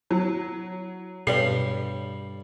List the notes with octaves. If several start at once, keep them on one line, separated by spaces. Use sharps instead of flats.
F#3 E4
G2 B2 G3 A4 C#5 C7